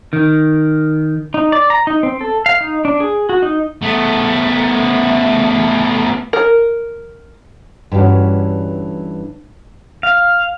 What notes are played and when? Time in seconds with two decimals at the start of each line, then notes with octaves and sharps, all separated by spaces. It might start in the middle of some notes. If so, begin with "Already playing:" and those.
0.13 D#3
1.34 D#4
1.52 D5
1.70 A#5
1.87 D#4
2.03 C4
2.21 A4
2.46 F5
2.61 D#4
2.85 D4
3.00 G#4
3.29 F#4
3.42 D#4
3.82 A3 B3
6.33 A#4
7.92 G2 D3 E3 C#4 F#4
10.03 F5